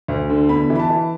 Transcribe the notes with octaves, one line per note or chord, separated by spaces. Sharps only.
D2
D3
E2 B5
E3
B5
A5
E3